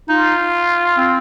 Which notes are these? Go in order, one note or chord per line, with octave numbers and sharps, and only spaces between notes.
D#4 F4
C4